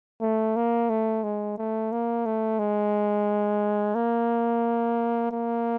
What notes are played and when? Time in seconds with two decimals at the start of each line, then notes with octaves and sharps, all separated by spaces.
0.22 A3
0.56 A#3
0.90 A3
1.23 G#3
1.58 A3
1.92 A#3
2.26 A3
2.59 G#3
3.95 A#3
5.31 A#3